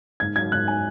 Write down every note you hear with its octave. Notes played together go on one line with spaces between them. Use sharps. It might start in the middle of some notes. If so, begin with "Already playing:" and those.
G#2 G#6
F#3 G#6
G#2 F#6
G#5